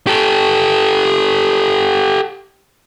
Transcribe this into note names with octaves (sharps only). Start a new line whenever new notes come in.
G4 A4